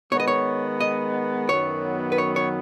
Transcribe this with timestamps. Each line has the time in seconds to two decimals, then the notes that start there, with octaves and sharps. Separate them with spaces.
0.12 D#3 G#3 B3 C#5
0.20 D#5
0.28 C#5
0.81 D#5
1.49 F#2 D#3 F#3 B3 C#5
2.12 B4
2.18 C#5
2.36 C#5